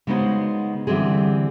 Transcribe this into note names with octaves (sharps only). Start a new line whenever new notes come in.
C#3 G#3 B3 D#4 F#4 C5
D3 E3 G3 C4 G#4